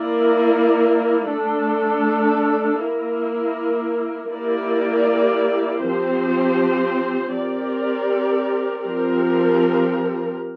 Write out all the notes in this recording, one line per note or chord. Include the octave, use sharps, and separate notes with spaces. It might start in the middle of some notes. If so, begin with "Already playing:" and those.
Already playing: A#3 E4 A#4 D5
A3 D4 A4
A#3 E4 A#4
A#3 E4 G4 A#4 D5
F3 C4 G4 C5
C4 G4 A#4 D5
F3 C4 G4 A#4